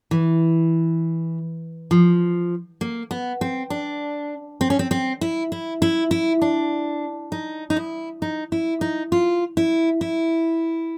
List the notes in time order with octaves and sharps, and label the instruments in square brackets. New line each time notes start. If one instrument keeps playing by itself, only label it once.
[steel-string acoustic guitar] E3
F3
A#3
B3
C4
D4
C4
C#4
C4
C4
E4
E4
E4
E4
D4
D#4
D#4
E4
D#4
E4
D#4
F4
E4
E4